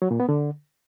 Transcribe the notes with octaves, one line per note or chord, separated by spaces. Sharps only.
F#3
A#2
B3
D3